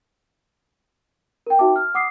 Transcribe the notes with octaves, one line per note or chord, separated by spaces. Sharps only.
A#4 G5
D#4 F#4 E5 G5 A5 D6
F6
F#5 D6 D#6 C7